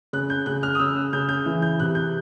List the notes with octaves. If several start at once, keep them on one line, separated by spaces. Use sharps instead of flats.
C#3 F#6
G6
C#3 F#6
F6
D#6
C#3 E6
F#6
C#3 G6
G6
E3
G6
C3 F#6
G6